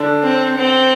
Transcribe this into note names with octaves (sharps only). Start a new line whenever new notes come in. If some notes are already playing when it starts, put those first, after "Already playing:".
Already playing: D3 D4
C4
C4